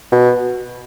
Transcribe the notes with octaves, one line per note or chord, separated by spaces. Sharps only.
B2